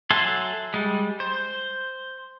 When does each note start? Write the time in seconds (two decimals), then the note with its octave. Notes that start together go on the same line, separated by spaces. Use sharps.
0.10 F#3 A4 E5 G#5 C6
0.74 G3 G#3
1.20 C5